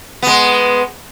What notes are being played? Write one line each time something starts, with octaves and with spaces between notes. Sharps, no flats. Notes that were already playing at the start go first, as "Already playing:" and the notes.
G#3 B3